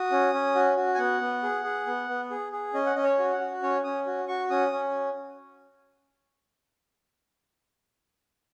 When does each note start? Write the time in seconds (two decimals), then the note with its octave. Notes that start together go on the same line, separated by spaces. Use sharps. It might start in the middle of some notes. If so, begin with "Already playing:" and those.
Already playing: F#4 D#6
0.11 C#4
0.33 C#4
0.55 F#4
0.77 F#4
0.94 G#5
0.98 B3 F#5
1.21 B3
1.43 G#4
1.64 G#4
1.87 B3
2.09 B3
2.30 G#4
2.52 G#4
2.74 C#4 D#5
2.86 F#5
2.96 C#4 D#5
3.03 C#5
3.19 F#4
3.32 F#5
3.40 F#4
3.62 C#4 C#5
3.84 C#4 D#6
4.07 F#4
4.28 F#4 C#6
4.50 C#4 D#6
4.72 C#4